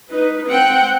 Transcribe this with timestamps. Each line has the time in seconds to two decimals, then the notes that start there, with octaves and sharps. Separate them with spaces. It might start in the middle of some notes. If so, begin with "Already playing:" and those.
0.11 D#4 B4
0.48 C4 F#5 G5